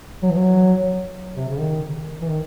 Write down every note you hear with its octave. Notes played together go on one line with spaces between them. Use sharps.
F#3
E3
F#3
C3
C#3
D#3
E3
D#3